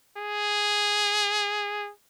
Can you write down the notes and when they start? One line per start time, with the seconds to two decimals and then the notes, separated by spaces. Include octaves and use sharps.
0.18 G#4